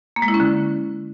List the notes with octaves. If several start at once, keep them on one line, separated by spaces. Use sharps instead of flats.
A#3
G#3
E4
C#4
D3